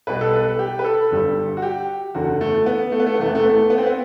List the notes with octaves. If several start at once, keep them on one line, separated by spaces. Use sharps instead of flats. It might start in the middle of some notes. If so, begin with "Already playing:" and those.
B1 B2 G3 B4
A4
B4
G4
B4
A4
G1 G2 D3 G3
F#4
G4
F#1 E2 D3 F#4
A3
B3
A3
B3
A3
B3
E2 C3 E3 A3
B3
A3
B3
A3
B3
C4
B3